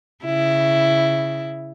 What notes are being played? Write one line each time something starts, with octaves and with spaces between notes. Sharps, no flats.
C#3 E4